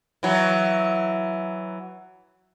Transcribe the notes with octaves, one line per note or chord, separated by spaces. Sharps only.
E3 F#3